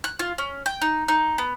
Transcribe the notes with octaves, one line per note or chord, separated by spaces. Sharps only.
F#6
F4
C#4
G5
D#4
D#4
B3